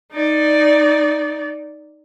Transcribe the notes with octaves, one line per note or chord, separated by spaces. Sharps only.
D#4 D5